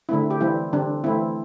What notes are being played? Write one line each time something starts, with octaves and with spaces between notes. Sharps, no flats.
D3 A3 C4 E4
G4
E3 G3 C4 E4
D3 G3 C4 D4
E3 A3 C4 E4